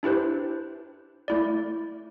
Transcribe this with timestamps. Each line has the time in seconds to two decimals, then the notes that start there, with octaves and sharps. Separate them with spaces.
0.03 D4 E4 G4 B4 C5
1.28 A3 E4 D5